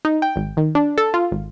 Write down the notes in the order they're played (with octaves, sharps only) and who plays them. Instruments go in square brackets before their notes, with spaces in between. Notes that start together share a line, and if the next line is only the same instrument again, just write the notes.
[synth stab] D#4
G5
G#1
D#3
D4
A4
F4
G#1